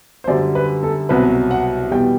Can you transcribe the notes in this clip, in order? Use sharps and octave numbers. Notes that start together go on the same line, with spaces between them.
C5
F#2 D3 G3 D5
B4
A4
C2 B2 F#3 B4
F#5
E2 B2 G3 G5